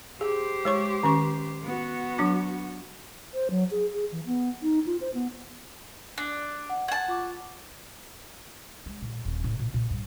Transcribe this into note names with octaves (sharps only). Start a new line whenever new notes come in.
G4 G#4 C5
G#3 C#5 C#6
D#3 C#4 C#6
B3 F#4
F#3 D4 D6
C5
F#3
G#4
G#4
E3
B3
D#4
F4
C5
B3
D4 F#6
F#5
F#5 A5 G#6
F4 C#6 D6
G#3
A#2
D#1
A2
A#2
A#2
G2